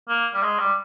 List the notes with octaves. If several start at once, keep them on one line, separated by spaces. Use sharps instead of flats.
A#3
G3
G#3
G3